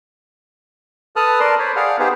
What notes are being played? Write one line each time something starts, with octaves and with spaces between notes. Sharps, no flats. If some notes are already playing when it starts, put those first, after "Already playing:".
A4 B4 A5 D#6 F6 F#6
A#4 D5 A5 C6
C5 C#5 B5
G#4 D5 F5 F#5 F6
B3 D#4 G4 G#4 B4 C5